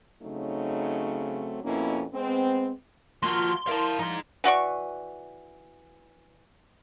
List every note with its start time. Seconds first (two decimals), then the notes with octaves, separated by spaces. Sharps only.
0.23 C#3 F#3 A3 C4 D#4
1.65 F2 B2 A#3 C#4 E4
2.14 G#3 B3 C4
3.22 F3 A#3 F4 F#4 C6
3.67 E4 A#4 D5 F5 A5
3.99 F3 D#4 C6
4.44 E3 F#4 D5 C#6